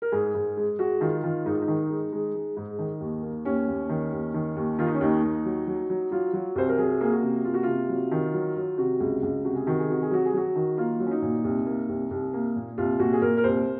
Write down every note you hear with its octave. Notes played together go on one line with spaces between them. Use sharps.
A#4
G#2 G#4
G#2
G#3
G#3 F#4
D#3 F4
D#3 F4
G#2 D#4
F4
D#4
D#3
G#3
G#3
G#3
G#2
D#3
D#2
A#3
D#2 C#4
D#2
D#3
D#2
D#3
D#2
D#3 F4
D#4
C#4
D#2 D#4
D#2
F#3
F#3
F#3
F#3 F4
F#3
C2 C5
A#4
F#3 G#4
A#3 G#4
F#4
C3
A#3 F4
F#4
C3 F4
F#3
D#3
F#3
F#3
C3 F#4
C#2
C#2
C3 F#4
G#4
D#3 F#4
G#4
C3 F#4
G#4
F#3 F#4
G#4
F#3 F#4
D#3
A#3 F4
F#3
C#4
D#4
A#2
C2
A#3
C2
C2
A#3
A#2
C2 F4
A#2 F#4
G#4
A#2 A#4
A#4
C2 C5